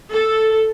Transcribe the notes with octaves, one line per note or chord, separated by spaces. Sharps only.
A4